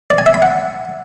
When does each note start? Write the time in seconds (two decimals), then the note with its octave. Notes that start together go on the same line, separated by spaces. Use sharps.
0.10 D5
0.18 G#5
0.26 E5
0.34 B5
0.42 F#5